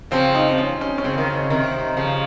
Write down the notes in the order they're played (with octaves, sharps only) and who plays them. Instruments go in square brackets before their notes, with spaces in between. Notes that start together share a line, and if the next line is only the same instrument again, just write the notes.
[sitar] C#3 F3 [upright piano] C4
[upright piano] D#4
C4
C#4
C#4
C#4
[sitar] C#3 [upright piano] C4
[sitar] D#3
C#3
C3 D#3
C#3 F3